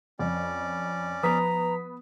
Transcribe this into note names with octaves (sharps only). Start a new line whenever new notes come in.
F2 C#4 D5
F3 B3 B4 A#5 D#6 B6